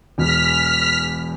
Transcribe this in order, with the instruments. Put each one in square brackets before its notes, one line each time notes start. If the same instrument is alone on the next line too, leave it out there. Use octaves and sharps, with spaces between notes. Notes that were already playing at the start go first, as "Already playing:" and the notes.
[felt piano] E1 E2 [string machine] F6 B6